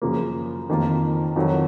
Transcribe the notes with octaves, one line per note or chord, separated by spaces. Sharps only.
F#2 C#3 F3 A#3
F2 D#3 A#3 F4
F2 D#3 F#3